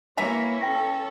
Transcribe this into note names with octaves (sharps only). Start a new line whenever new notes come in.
E3 A#3 E4 C#5 E5 A#5
C#4 A4 G5 A#6